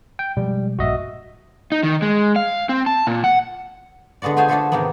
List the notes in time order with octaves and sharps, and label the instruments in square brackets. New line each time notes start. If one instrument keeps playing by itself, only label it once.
[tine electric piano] G5
[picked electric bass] B2 F3 G#3 [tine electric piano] G3
[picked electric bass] A#1 G2 A#2 [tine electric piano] F#4 D#5 E5
[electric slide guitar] D#4
D#3
G#3
F5
C4
A5
A#2
F#5
[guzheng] D3 G#3 B3 F#4 D5
A3 F4 G#4 C5 F5 G#5
D4 F4 F#4 G#4 A4 E5
G#2 C3 D#3 A#3 B3